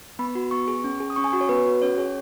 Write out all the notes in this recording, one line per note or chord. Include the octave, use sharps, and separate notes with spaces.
B3 B5
F#4
B3 C#6
G#4
C#4
G#4
D#6
C#4 C#6
G#5
F#4 C#6
C#5
B3 B4
F#4
C#4 C#5
G#4 C#5